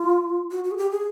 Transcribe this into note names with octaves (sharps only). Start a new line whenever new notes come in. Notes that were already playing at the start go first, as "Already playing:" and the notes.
Already playing: F4
F#4
F#4
G#4
G4
G#4